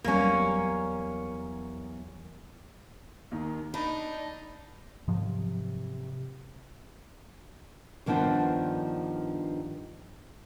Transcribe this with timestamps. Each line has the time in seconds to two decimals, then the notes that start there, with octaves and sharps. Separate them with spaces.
0.04 E2 F#3 G3 A#3 C#4
3.31 D#2 D#3
3.74 D4 D#4 B5
5.08 G#2 C3 F3 F#3
8.06 G2 D#3 F3 B3 D4 C5